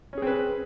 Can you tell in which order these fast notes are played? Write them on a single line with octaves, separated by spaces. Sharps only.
C#4 G#4 C4 B4